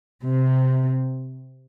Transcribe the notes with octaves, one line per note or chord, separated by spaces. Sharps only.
C3